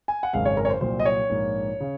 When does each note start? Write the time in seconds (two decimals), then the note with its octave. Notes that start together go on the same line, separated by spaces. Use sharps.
0.08 G#5
0.23 F#5
0.33 G#1 F#2 C#3 G#3 C4 F5
0.45 C#5
0.57 A#4
0.65 C#5
0.70 C5
0.81 C2 A#2 F#3 C5
0.99 D#5
1.05 C#5
1.30 A#1 G#2 F3 A#3
1.80 C#3